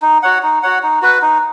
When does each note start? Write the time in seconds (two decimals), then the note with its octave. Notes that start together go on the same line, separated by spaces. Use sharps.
0.02 D#4
0.23 F#4 C#5 F#5
0.43 D#4
0.63 F#4 C#5 F#5
0.83 D#4
1.02 F#4 B4
1.22 D#4